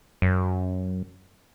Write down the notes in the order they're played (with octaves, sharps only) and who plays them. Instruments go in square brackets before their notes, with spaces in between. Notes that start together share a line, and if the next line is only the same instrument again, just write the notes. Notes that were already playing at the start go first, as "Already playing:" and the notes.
[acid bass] F#2